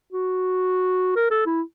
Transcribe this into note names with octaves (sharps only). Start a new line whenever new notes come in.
F#4
A#4
A4
E4